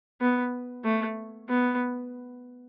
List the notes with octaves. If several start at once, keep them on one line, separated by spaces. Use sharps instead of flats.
B3
A3
B3